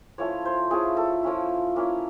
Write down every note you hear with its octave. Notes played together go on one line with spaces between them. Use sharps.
F3 A3 C#4 E4 C#5
C5
F3 A3 C#4 E4 G#4
A4
F3 A3 C#4 E4
A#3 C#4 E4